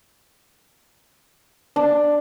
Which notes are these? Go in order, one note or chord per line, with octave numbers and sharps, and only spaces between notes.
D4